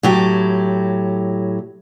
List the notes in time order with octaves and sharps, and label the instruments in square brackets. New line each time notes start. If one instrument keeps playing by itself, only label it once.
[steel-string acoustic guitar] A2 F#3 G4